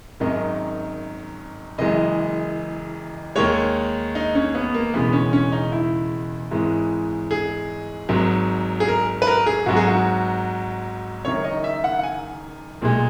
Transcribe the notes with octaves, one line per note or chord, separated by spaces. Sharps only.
G#1 F#2 D#3 G#3 D#5
F#1 F#2 E3 G#3 D#5
D#2 D#3 G#3 C#5
D#4
C#4
B3
A#3
E1 E2 C#3 G#3 B3
C#4
C#4
D#4
E4
G#1 G#2 E3 G#3
G#4
G#1 G#2 F#3
G#4
A#4
B4
A#4
G#4
G#1 G#2 F#3 F#4
G#4
F#4
F#1 F#2 D#3 C#5
D#5
E5
F#5
F#5
G#5
B1 A#2 G#3